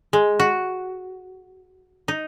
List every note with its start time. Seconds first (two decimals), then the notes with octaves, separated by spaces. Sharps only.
0.13 G#3
0.39 F#4
2.08 D#4